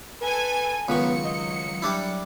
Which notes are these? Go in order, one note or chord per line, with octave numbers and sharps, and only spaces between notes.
A4 B4 G#5
C#2 D#3 F#3 B3 C#6 C#7
D#5
G3 D4 E4